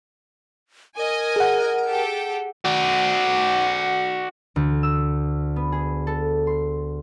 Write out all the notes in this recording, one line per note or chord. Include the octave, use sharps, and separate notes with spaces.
A#4 D#5 G#5
G#4 F#5
G4 A4 G5
F#4 D5
D2
E6
B3
G#4
A4
C6